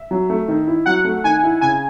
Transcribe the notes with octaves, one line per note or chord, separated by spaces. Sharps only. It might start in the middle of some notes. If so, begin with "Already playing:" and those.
Already playing: E5
F#3
A3
D#3
E4
F#3 F#5
A3
D#3 G#5
E4
C#3 G#5